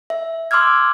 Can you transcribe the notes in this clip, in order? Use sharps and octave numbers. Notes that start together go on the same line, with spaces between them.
E5
C6 D6 E6 F6 G#6